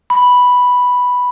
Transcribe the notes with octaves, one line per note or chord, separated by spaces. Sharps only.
B5